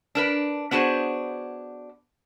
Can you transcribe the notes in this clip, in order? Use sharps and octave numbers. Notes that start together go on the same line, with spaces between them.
D4 A#4 B4
B3 D4 F#4 G#4 C5